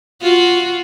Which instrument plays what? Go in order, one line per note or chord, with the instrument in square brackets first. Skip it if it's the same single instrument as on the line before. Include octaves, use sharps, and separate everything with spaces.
[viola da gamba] F4 F#4